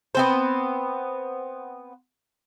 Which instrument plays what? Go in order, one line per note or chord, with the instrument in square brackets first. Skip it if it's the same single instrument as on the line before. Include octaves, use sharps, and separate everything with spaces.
[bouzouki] B3 C4 C5